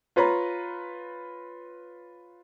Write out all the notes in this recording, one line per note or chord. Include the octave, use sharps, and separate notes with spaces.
F4 B4 C#5 A#5 B5